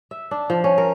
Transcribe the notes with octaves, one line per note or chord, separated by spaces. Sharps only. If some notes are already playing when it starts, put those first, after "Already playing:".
E5
D4
F3
C#4
A#4